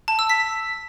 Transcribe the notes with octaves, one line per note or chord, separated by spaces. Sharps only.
A5
E6
B6